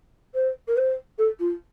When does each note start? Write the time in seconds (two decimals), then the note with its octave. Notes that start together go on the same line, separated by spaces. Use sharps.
0.34 C5
0.68 A#4
0.76 C5
1.18 A4
1.39 F4